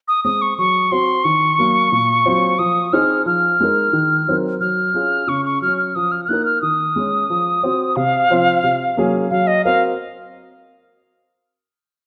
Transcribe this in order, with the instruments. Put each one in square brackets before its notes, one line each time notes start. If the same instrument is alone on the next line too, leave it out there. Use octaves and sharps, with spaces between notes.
[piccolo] D#6
[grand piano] G#3 C4 [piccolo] D#6
[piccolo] C#6
[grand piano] F#3 [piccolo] C#6
[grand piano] C4 F#4 [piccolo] C6
[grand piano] D#3 [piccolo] C#6
[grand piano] F#3 A#3
A#2
F#3 C4 F4
[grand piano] F3 [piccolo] D#6
[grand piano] C4 D#4 G#4 [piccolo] F6
[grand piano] F3 [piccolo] F6
[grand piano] G#3 D#4 A#4
D#3
F#3 C4 D#4 A#4
[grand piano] F#3 [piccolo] F6
[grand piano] C#4 F4 G#4
[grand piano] C#3 [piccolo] C#6
[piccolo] C#6
[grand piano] F#3 C#4 [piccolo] F6
[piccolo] F6
[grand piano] F3 [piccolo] D#6
[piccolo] F6
F6
[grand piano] A#3 D#4 A#4 [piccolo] F#6
[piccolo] F6
[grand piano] D#3 [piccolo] D#6
[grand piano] G#3 C#4
F3
C4 F#4
[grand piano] C3 [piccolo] F5
[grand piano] F3 C4 F4
C3
F#3 A#3 C#4 G#4
[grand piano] F#3 [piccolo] F5
[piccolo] D#5
[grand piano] C4 F#4 A#4 [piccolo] F5